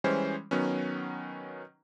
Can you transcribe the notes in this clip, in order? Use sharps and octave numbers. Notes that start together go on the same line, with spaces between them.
E3 G3 G#3 C#4 C5
D#3 F#3 B3 C#4